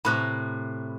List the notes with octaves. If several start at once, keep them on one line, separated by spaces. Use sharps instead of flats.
A2 C3 A#5 B5 F#6